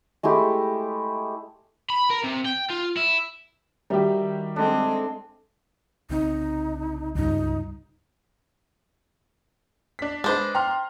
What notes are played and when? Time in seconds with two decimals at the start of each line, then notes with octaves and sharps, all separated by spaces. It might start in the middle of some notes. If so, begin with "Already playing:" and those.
0.23 G#3 A3 E4 G4
1.90 B5
2.10 A#4
2.24 C3
2.45 G5
2.70 F4
2.97 E4
3.90 D#3 G3 F#4 G4 A#4 E5
4.56 G#3 C4 D4 A4
6.10 C2 C#3 C4 D#4
7.15 C#2 G2 D#4
9.99 D4 B6
10.24 G#3 D4 B4 C5
10.55 G5 A#5 C6 F6